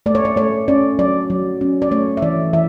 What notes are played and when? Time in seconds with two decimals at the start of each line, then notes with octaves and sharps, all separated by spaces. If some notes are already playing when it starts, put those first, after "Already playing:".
0.06 A3 D5
0.15 C#5
0.25 D5
0.36 A3 C#5
0.68 C#4 D5
0.99 F#3 D5
1.30 F#3
1.61 C#4
1.82 D5
1.91 A3 C#5
2.17 E5
2.22 E3 D5
2.53 E3 E5